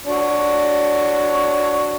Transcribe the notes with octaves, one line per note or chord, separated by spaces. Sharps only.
D4 F#4 C#5